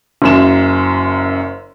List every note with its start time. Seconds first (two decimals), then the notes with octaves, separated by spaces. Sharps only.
0.22 F#1 F#2 E7